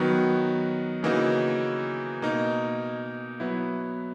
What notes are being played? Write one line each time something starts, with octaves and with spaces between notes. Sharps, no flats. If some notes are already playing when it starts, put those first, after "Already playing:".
Already playing: D#3 F#3 B3 F#4
C#3 E3 A#3 D#4 F#4
B2 A#3 D#4
F#3 B3 E4